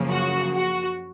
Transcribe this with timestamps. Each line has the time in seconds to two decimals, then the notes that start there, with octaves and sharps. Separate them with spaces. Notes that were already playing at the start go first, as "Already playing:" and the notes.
Already playing: F#2 C#3 F3 A#3
0.11 F#4
0.54 F#4